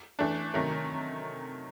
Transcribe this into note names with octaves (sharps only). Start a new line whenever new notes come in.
E3 A3 D4
C3 D#3 F#3 A3